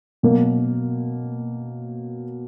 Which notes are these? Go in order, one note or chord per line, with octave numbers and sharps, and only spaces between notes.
B2 F#3 A#3